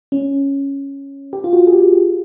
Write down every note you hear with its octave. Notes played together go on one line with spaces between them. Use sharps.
C#4
G4
F4
F#4
G#4
G4